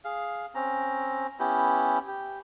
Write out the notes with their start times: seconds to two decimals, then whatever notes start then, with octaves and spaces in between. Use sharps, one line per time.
0.05 G#4 F5
0.55 C4 C#4 A#5
1.39 B3 C#4 E4 G4
2.08 G4